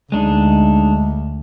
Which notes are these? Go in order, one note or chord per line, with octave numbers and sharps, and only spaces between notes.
D2 G#3 D4 D#4